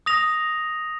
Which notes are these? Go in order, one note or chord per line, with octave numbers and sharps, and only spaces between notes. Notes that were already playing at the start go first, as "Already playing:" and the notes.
D#6 A#6 F7